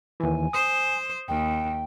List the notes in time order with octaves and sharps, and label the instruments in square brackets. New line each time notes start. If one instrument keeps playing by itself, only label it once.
[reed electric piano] D#2 E3 [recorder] G#5
[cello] C5 [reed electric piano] D#6
[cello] D#2 [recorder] G5